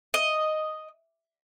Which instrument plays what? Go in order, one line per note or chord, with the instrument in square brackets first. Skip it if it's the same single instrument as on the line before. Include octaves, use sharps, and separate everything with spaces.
[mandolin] D#5